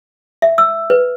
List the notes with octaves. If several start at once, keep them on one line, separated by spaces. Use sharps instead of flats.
E5
E6
B4